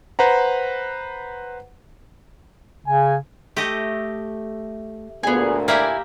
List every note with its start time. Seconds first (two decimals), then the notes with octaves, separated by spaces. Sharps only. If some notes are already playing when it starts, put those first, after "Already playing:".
0.19 B4 C5 F#5 A#5
2.87 C#3 G#5
3.57 A3 G4 D#5
5.23 D2 A#2 B3 G#4
5.68 A#3 E4 G4 D5 E5 G#5